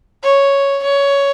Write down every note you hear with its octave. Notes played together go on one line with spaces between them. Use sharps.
C#5
C#5